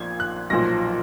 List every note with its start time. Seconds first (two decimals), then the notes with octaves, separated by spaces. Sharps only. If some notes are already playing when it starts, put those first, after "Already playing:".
Already playing: A#1 A#2 F3 G#6
0.20 F#6
0.50 B1 A#2 F3 A#6